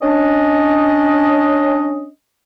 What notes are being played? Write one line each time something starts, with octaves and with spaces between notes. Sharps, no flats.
C#4 D4 D#5